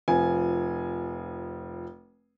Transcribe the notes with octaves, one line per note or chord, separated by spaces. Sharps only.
F1 F3 G#5